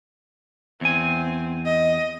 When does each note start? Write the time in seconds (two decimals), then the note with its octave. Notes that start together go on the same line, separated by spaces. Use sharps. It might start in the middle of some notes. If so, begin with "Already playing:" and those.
0.81 E2 C4 G#5
1.66 D#5